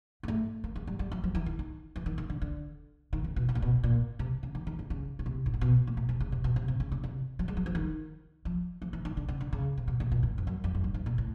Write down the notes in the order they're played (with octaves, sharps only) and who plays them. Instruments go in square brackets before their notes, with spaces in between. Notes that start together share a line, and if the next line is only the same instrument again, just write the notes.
[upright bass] A#3
A3
A#3
G#3
G3
G3
F#3
F3
E3
D#3
D#3
E3
D#3
D#3
D3
D3
D#3
C#3
B2
B2
A#2
B2
A#2
C3
C#3
D#3
D#3
D3
C#3
C#3
C3
A2
A#2
B2
A#2
B2
C3
C#3
C3
B2
C3
C3
C#3
C#3
C3
F#3
G#3
F#3
F3
D#3
F3
F3
E3
D#3
D3
C#3
D3
C#3
C3
B2
A#2
A#2
A2
F2
F#2
F2
F#2
G2
G#2
A#2
A2